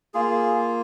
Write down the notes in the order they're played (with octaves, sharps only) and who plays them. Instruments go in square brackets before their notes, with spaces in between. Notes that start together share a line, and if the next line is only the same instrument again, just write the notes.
[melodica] A#3 F4 G#4